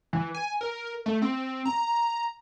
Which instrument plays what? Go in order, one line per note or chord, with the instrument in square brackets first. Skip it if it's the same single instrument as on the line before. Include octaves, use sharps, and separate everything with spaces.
[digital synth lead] E3
G#5
A#4
A3
C4
A#5